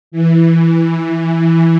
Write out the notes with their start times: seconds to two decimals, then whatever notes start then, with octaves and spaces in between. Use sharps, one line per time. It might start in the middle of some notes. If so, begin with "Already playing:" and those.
0.12 E3
0.54 E3
1.38 E3